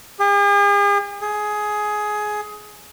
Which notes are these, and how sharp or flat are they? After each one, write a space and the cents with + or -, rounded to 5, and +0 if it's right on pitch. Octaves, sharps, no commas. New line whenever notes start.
G#4 -45
G#4 +15